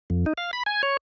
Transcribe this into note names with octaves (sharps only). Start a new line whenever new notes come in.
F2
D#4
F5
B5
G#5
C#5